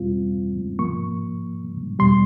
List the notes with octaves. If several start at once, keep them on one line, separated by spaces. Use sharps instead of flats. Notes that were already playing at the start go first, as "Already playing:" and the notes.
Already playing: E2 B2 G3 C4 F4
G#2 F3 A#3 C#6
E2 B2 G3 C6